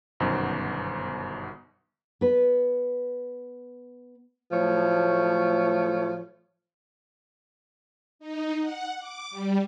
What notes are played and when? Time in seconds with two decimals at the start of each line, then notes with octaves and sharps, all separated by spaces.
0.20 G1 F#2 B2 D#3 B3 C5
2.21 B3 B4
4.52 A2 F3 F#3 A3 C#5
8.19 D#4
8.60 F#5
8.99 D6
9.31 G3